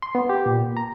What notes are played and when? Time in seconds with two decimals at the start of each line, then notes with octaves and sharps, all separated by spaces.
0.02 C6
0.15 B3
0.29 G4
0.46 A#2
0.77 A#5